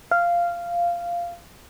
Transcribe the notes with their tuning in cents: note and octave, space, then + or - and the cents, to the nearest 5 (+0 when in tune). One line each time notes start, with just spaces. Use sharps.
F5 -10